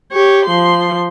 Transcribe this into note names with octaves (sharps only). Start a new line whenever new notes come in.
G4 C#5
F3 C6